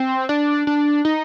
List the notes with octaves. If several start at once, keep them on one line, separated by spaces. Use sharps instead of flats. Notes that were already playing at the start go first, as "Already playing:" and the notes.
Already playing: C4
D4
D4
D#4